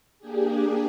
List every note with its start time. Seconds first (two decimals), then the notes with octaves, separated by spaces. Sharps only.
0.19 A#3 D4 G4 G#4